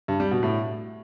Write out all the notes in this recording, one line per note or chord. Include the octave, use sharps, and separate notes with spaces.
G2
G3
B2
A2